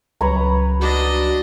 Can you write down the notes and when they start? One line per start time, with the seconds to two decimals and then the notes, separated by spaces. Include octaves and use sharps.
0.21 C#2 F#3 G3 B4 C#5 A#5
0.81 D4 F#4 D#5